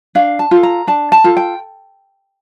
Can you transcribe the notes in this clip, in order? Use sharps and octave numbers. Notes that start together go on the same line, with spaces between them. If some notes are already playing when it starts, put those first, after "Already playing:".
D4 F5
A5
F4 A4
A#5
D4 A5
A5
F4 A4
G5